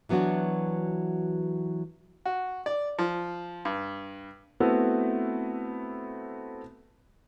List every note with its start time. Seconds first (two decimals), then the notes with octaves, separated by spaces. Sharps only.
0.09 E3 F#3 B3 D4 F#4
2.25 F#4
2.66 D5
2.99 F3
3.65 G2
4.60 A3 B3 C4 E4 F#4 B4